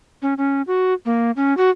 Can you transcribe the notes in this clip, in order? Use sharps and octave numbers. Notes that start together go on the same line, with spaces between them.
C#4
C#4
F#4
A#3
C#4
F#4